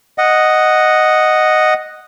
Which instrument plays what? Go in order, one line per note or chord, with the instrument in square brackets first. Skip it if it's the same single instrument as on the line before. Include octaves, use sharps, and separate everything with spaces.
[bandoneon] D#5 F#5